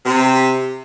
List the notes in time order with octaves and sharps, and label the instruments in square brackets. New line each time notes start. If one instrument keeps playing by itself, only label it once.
[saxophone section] C3